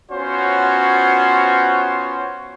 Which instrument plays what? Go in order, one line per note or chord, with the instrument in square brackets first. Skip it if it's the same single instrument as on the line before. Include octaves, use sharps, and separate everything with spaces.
[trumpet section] B3 C#4 F4 F#4 C5 C#5